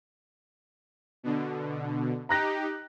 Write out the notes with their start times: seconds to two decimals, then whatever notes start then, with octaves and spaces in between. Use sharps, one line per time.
1.23 B2 D3
2.29 D#4 G4 A#5 F#6 A#6